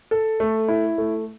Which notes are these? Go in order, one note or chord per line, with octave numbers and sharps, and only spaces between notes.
A4
A3
E4
A3